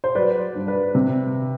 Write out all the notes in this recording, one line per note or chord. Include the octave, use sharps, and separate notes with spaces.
C5
F#3 B4 D5
G2
B4
C3